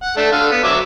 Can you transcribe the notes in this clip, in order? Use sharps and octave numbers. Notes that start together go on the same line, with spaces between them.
F#5
A3 D4
D3 F5
B3
F#3 E5 D6